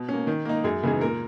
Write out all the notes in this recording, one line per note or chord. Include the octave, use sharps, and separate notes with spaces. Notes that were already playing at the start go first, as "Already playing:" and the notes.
Already playing: B2
A#3 C#4
D#3
A#3 D#4
F#2 G#4
C#3 E3 B3 D#4 G#4
A#2 A#4